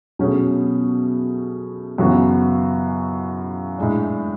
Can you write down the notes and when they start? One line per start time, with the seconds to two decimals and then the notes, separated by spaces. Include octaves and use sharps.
0.19 B2 F#3 A3 C#4 G#4
1.98 F#2 C#3 E3 B3 F#4
3.78 A2 G#3 D4